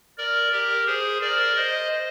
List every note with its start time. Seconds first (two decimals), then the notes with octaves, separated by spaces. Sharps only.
0.18 A#4 D5
0.52 G4 A#4
0.87 G#4 C5
1.21 A#4 D5
1.56 C5 D#5